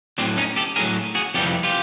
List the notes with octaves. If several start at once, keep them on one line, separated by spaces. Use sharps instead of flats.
A2 F#3 C4 D4
C#4 D#4
G4 A4
A2 F#3 G#4 A#4
F#4 G#4
F2 C3 E3 G3 G4 A4
F4 G4